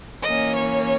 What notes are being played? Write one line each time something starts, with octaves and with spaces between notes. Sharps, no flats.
E3 A#3 C#4 D#5
C#5